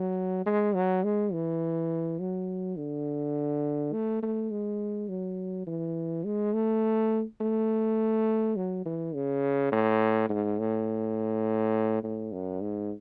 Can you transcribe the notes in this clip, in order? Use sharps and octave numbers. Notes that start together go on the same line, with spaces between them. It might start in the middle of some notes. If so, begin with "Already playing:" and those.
Already playing: F#3
G#3
F#3
G#3
E3
F#3
D3
A3
A3
G#3
F#3
E3
G#3
A3
A3
F#3
E3
C#3
A2
G#2
A2
A2
F#2
G#2